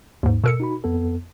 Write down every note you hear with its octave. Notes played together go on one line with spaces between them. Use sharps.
D#2 G#2
B2 A4 A#4 E6 C#7
D#4 F#4 B5
F2 B3 A4